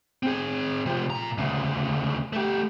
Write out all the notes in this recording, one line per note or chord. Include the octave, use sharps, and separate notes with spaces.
C4 G#4
C3 F3
A#2 A#5
D2 C#3
A3 G4